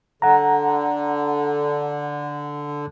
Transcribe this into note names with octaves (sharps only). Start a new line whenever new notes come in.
D3 F#5 A#5